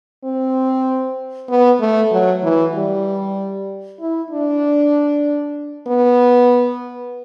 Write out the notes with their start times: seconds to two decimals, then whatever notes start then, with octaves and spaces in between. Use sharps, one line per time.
0.24 C4
1.49 B3
1.80 A3
2.12 F#3
2.43 E3
2.75 G3
4.00 E4
4.31 D4
5.87 B3